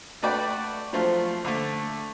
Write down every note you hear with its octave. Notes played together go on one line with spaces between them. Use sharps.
A3 F#4 B4 D5 G5
F3 F#3 A3 C4 F4 C5
D3 A3